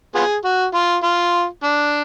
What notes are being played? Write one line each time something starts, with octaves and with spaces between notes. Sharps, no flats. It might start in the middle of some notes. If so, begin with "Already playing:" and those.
B3 F4 G#4
F#4
F4
F4
D4